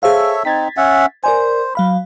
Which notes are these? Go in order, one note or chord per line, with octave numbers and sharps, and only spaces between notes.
G#4 A4 C5 C#5 E5 F5
C4 D#4 G#6 A6 B6
C#4 E5 F#5
A#4 C5 D5 G#5
F#3 F5 B5